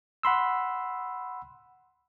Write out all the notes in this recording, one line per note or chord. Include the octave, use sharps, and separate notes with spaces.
F#5 B5 C6 E6